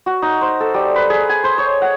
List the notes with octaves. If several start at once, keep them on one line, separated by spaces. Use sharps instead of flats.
F#4
D#4
C5
A4
G3
B4
G#4
G#5
C5
C#5
F#5